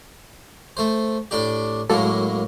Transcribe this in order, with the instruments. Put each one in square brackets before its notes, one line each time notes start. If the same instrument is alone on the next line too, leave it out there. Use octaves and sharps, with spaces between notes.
[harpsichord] A3 C5
A2 D4 G4
[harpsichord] F#2 A2 A#3 [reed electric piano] G#3 F#4 A4